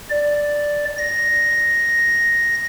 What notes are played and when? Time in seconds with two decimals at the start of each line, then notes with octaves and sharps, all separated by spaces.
0.10 D5
0.98 A#6